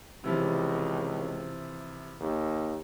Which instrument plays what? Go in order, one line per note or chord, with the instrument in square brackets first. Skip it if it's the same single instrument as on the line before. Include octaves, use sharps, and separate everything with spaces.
[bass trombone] C#2 [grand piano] C3 E3 F3
[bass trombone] D#2